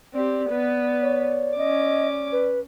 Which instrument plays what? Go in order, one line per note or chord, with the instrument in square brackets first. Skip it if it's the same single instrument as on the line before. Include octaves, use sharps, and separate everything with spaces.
[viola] C4 G4 [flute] D5
[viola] B3 B4
[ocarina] C#5
[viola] C#4 D6 [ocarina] D#5
[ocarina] B4